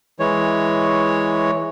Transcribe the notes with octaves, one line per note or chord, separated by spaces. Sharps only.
E3 G#3 C#5